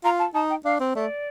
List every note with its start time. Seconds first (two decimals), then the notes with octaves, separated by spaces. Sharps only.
0.04 F4 A#5
0.19 A5
0.34 D#4 A5
0.50 G5
0.65 D4 F5
0.80 C4
0.95 A3 D5